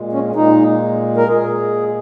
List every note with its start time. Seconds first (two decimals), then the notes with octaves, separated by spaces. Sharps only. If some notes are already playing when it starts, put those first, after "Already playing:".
Already playing: A#2 G#3
0.13 C#4
0.36 A#2 G#3 D#4
1.17 A#4
1.28 A#2 G#3 G#4